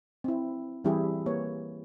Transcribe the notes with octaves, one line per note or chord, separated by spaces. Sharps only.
C4 E4
E3 G3 C4 E4 G4 G#4
A#3 B4 C#5